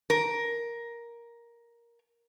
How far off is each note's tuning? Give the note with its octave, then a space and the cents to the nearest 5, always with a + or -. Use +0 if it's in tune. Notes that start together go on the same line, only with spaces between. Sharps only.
A#4 +10